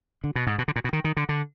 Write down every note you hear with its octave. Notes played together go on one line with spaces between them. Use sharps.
D3
B2
G#2
B2
D3
A#2
B2
D#3
D#3
D3
D3